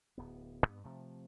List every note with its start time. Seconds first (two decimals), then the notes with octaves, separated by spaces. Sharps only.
0.18 D1 B3
0.66 G2 B3
0.84 C3 F3 A3